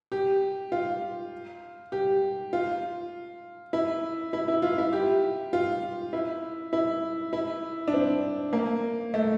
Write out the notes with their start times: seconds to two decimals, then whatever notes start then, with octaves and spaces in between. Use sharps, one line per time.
0.12 G4
0.72 F4
1.92 G4
2.53 F4
3.73 E4
4.33 E4
4.48 E4
4.62 F4
4.78 E4
4.93 G4
5.53 F4
6.13 E4
6.73 E4
7.33 E4
7.88 D4
7.94 C4
8.53 A#3
9.14 A3